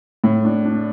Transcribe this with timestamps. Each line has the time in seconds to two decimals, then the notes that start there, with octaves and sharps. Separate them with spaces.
0.24 A2
0.45 D4
0.65 D4